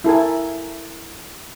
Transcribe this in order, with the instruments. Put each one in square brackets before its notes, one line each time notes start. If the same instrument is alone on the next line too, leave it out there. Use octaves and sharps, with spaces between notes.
[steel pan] E4 A4 A#4 G#5